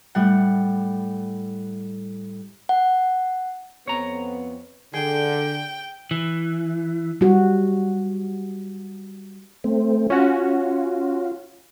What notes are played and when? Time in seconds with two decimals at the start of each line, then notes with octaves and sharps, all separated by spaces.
0.15 A2 G3 F#5
2.69 F#5
3.88 F2 B3 C4 C#5 A#5
4.94 D3 G#4 G5
6.11 E3
7.21 G3 F#4
9.64 A3 C4
10.10 C#4 F4 F#4